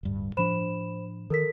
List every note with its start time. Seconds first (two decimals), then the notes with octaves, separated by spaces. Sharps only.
0.03 D1 G2
0.37 A2 F3 D4 C5 B5 E7
1.30 D#3 A4 A#4 B6